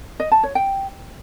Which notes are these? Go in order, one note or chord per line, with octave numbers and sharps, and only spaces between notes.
D#5
A5
C#5
G5